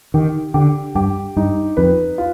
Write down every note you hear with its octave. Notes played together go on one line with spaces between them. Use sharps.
D#3 G4
D3 G4
G2 G4
G2 D#4
F2 B4
F4